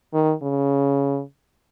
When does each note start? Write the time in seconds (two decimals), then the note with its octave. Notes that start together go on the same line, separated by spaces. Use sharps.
0.13 D#3
0.42 C#3